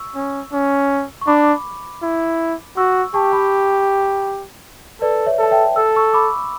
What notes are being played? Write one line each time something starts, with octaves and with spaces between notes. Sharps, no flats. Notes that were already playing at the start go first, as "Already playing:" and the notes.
Already playing: C#6 E6
C#4
C#4
C#6
D4 B5 D6
E4
F#4 C#6 E6
G4 A5 C#6
C#6
G5 B5
A4 B4 D5
C#5 E5
A4 A5
E5 G5
A4 E6
C#6 E6
B5 D6